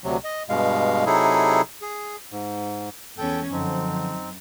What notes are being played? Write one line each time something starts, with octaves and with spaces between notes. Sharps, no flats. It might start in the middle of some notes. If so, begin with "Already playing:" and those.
D2 C3 F#3
D#5
G2 B2 G#3 F5
C3 F#3 D#4 E4 G#4 A4
G#4
G#2
E2 C#4 A4 G5
F#2 D3 F3 C4 D#4